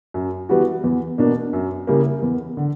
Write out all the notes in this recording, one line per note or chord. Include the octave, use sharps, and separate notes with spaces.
F#2
E3 G3 B3 F#4
E2
B2 A#3 D4
F#2
C#3 G3 A#3 E4
E2
D3